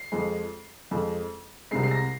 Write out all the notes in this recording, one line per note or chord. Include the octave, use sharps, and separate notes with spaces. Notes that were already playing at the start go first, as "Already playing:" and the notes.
Already playing: C7
F2 F3 G#3
F2 F3 G#3
C2 C3 G#3 C7
C7
A#6